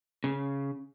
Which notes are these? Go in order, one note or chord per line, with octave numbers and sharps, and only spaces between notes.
C#3